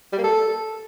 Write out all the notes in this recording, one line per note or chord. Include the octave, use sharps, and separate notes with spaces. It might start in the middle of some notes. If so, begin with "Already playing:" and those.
G3
A#3
A4